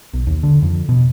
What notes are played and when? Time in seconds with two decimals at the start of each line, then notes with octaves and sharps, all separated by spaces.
0.14 B1
0.27 D#2
0.43 D3
0.62 F2
0.89 B2